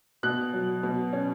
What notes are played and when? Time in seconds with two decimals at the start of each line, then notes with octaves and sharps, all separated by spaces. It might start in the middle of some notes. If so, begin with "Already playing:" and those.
0.23 B2 F#6
0.53 F#3
0.83 B2
1.13 C#4